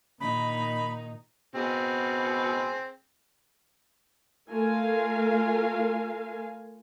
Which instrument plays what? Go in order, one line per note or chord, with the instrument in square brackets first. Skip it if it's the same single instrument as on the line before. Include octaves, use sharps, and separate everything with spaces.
[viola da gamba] A#2 D#3 D#4 [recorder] B5
[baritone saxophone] B2 [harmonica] C4 G#4
[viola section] A3 F4 A#4 F5 G#5